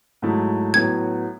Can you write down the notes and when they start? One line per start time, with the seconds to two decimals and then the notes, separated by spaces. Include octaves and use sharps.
0.22 G#2 F#3 A3 E4
0.74 A2 F#3 B3 E4 G#6